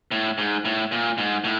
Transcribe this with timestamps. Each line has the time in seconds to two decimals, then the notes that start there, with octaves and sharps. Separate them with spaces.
0.11 A2
0.38 G#2
0.65 A2
0.92 A#2
1.18 G#2
1.44 A2